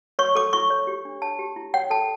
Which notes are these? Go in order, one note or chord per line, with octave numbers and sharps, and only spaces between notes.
C#5 C#6
A4 D6
E4 C#6
C#5
G4
D4
C#5 A5
G4
E4
C#5 G5
A4 A5